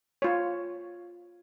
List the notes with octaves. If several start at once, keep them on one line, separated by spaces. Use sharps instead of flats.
F4 C#5